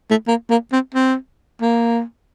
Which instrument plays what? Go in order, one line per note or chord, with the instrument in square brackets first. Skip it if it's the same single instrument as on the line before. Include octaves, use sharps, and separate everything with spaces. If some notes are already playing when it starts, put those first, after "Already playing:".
[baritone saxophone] A3
A#3
A#3
C4
C4
A#3